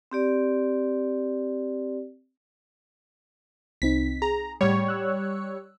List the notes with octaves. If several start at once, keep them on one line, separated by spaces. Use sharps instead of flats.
C4 G4 D5
C2 C4 D#4 B6
G#4 A#5
A2 G3 C#5 F#5
E6 F#6